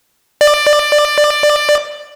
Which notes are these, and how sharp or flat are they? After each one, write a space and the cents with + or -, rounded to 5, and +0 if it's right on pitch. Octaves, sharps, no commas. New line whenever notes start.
D5 +15